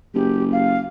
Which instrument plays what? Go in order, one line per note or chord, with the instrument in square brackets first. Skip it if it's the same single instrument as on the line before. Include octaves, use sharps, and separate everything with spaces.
[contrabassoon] F#1 [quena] G4
[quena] F5